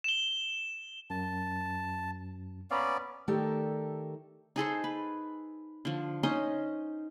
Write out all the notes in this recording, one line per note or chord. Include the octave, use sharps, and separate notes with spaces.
E7 G7
F#2 A5
B3 C#4 D5 F5 A#5 B5
D#3 A3 G4 A4 A#4 D5
D#4 G#4 A4 C5
B4
D3 F3
C#4 D#4 C5 D#5